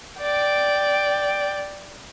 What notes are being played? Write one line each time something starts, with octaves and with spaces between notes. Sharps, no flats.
D5 G5